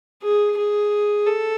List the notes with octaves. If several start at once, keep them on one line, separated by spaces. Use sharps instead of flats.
G#4
G#4
A4